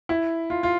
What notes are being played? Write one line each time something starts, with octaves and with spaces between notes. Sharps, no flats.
E4
F4
F4